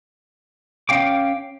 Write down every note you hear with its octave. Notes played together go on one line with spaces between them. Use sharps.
C#4 F5 G5 D6